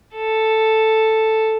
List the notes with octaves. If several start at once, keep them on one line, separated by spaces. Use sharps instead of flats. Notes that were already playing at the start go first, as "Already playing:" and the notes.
A4